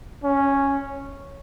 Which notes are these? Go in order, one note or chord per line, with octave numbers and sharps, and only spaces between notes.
C#4